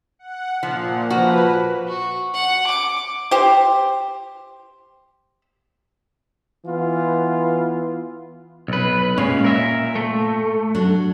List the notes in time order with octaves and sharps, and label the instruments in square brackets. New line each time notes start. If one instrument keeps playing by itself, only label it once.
[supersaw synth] F#5
[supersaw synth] A#2 [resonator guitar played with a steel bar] F3
[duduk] F3 [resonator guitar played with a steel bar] A#3 F#4 [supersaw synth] B4
[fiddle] F#4
F#5
D6
[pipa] G4 C5
[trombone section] E3 B3 F4
[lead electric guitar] B1 B4
[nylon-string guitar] A#2 [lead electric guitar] G#3 C#4
[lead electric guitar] A#4 E5
A3
[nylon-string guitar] F#3 D4